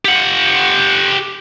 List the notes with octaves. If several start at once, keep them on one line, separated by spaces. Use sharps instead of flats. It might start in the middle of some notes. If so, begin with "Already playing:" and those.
G4 F#5